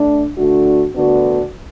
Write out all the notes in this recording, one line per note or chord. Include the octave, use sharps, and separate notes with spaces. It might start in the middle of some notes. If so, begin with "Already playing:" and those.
Already playing: A3 D4
D3 A3 D4 F#4
D2 D3 B3 D4 F#4